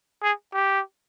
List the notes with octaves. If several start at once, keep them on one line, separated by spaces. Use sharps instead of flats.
G#4
G4